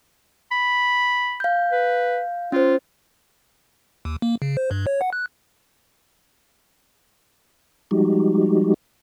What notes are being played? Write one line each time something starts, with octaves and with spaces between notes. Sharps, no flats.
B5
F5 G6
B4
C#4 F4 C5
D#2
A#3
C#3
C5
G2
C#5
F#5
F#6
F3 G3 G#3 D#4 F#4 G4